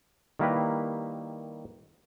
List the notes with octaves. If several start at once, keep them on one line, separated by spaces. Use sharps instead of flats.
D#3 G3 A#3 E4 G4 B4